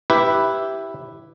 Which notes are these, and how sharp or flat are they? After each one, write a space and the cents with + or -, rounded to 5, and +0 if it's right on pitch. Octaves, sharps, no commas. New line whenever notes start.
E4 +0 G4 +0 B4 +0